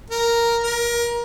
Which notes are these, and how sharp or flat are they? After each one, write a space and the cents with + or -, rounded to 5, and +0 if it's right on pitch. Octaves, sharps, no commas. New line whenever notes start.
A#4 +0
A#4 +25